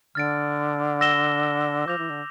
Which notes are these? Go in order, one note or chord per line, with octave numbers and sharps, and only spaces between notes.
D3 F6 A6 D7
E6 A#6 E7 G7
F3 D6 G6 A#6 F7
E3
D3